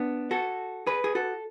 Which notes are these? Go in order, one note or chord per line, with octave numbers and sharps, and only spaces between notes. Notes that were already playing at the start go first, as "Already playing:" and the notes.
Already playing: B3 D4
F#4 A4
G#4 B4
G#4
F#4 A4